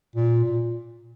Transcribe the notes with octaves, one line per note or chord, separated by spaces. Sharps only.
A#2
A#2